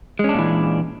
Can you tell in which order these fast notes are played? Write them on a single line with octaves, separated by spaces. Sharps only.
G#3 C#4 D4 A#2 E3